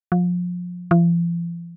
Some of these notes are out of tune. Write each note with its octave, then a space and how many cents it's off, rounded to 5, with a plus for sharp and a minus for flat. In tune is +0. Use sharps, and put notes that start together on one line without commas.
F3 +30
F3 -45